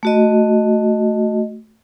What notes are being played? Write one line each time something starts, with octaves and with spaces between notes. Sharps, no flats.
A3 F#4 D#5